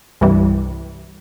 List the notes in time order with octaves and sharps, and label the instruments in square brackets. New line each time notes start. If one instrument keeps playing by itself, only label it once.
[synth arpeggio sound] C2 G2 E3 G3